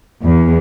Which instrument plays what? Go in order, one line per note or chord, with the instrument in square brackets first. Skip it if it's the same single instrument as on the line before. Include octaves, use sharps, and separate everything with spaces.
[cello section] E2